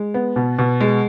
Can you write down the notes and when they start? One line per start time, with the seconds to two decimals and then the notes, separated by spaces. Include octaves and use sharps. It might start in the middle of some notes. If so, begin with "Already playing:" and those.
Already playing: G#3
0.14 B3
0.36 B2
0.59 B2
0.81 G#3